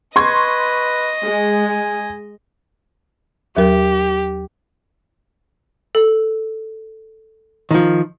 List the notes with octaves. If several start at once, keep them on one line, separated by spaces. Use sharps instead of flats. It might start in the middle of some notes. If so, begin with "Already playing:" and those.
B4 D#5 C6 C#6 G#6
G#3 G#5
D#2 F#3 G4 A#4
A4
D#3 F3